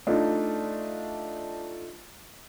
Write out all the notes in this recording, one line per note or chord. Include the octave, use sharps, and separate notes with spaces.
A3 D4 D#4 F4